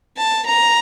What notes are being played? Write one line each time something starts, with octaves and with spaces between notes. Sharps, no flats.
A5
A#5